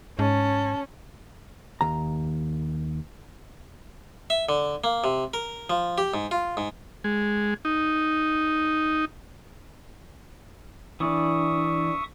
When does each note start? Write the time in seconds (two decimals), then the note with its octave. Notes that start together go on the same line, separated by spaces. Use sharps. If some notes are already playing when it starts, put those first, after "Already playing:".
0.19 G#2 C#4 A5
1.81 D#2 A#5
4.30 E5
4.49 D3
4.84 A#3
5.04 C3
5.34 A#4
5.70 F3
5.98 G4
6.14 G#2
6.31 F4
6.57 G#2
7.04 G#3
7.65 D#4
11.00 E3 D4 E5 C#6 D#6